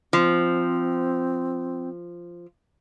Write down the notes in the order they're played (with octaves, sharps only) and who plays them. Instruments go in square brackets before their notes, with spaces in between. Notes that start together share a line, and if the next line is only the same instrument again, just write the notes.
[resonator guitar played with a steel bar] F3 [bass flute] C4